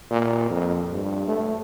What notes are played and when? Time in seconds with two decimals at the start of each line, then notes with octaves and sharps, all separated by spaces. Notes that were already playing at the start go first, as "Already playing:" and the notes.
0.11 A#2
0.50 F2
0.93 G2
1.28 A3